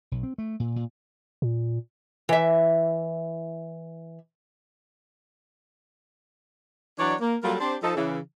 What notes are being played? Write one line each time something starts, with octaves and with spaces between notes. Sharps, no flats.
B1
C4
A3
A#2
A#2
A#2
E3 E5
E3 F#3 D4 C#5 D5
A#3
F#3 G3 A#3 F4 A4 A#4
C4 D4 G4 C5
F3 D#4 A4
C#3 E3